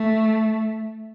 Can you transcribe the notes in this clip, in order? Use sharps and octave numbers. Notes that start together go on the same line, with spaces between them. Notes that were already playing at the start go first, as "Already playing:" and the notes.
Already playing: A3